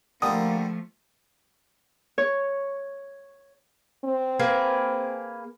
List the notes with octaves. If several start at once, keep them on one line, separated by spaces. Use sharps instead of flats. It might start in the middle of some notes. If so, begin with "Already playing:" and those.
D3 F3 G3 A3 A#3 D#6
C#5
C4
A#3 G#4 B4